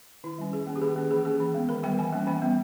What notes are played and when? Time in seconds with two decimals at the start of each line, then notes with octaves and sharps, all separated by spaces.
0.24 D#3 E4
0.38 G3 C#4
0.53 D#3 G#4
0.67 A#3 C#4
0.76 G4
0.81 D#3 G#4
0.96 A#3 C#4
1.11 E3 G#4
1.25 A#3 C#4 G#4
1.40 E3
1.54 G#3 B3
1.69 D#3 A#4
1.83 G3 B3 G5
1.99 E3 G#5
2.12 G3 A#3 C#4
2.27 E3 G5
2.42 G3 B3